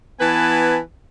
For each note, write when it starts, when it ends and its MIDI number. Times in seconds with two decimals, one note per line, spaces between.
0.19 0.77 52
0.19 0.77 59
0.19 0.77 71
0.19 0.77 80
0.19 0.77 81